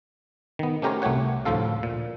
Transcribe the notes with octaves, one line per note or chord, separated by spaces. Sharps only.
D#3 B3
A3 C#4 G4 A#4 C5 C#5
C2 A3 F#4 G4 C#5 F#5
D2 A2 F3 F4 A4 F5
A#2